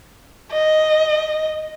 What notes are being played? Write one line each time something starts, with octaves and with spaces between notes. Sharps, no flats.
D#5